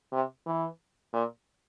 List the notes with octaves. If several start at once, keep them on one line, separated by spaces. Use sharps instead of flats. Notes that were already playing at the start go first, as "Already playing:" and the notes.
C3
E3
A#2